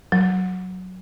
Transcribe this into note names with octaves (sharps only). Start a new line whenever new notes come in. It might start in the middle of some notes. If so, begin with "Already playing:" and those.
F#3